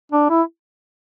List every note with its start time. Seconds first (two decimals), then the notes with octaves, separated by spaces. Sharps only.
0.12 D4
0.30 E4